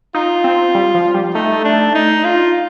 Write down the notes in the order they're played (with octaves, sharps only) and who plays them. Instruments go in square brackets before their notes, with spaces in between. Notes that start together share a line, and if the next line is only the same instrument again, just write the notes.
[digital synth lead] D#4 [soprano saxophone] F4
[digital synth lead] C4
G3
F3
G3
[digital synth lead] A3 [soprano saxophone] D#4
[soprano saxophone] D4
D#4
F4